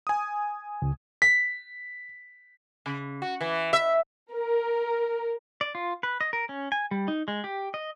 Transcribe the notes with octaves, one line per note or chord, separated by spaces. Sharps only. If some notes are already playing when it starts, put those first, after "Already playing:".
G#5 D#6
C#2
B6
C#3
F#4
E3
E5
A#4
D5
F4
B4
D#5
A#4
C#4
G#5
G3
D#4
G#3
G4
D#5